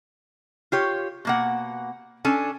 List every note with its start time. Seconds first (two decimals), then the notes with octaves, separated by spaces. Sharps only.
0.72 F4 G4 C#5
1.25 B2 A#3 F#5
2.25 C#4 D4 A4 G#5